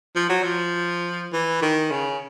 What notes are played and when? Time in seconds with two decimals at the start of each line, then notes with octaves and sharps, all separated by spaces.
0.16 F3
0.29 F#3
0.43 F3
1.33 E3
1.62 D#3
1.91 C#3